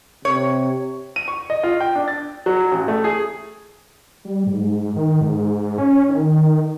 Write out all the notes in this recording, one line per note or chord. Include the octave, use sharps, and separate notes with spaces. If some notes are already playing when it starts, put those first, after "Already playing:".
C3 C#5
D#7
C#6
D#5
F4
G5
D4
A6
F#3
A1
A3
G#4
G3
G#2
D#3
G#2
C#4
D#3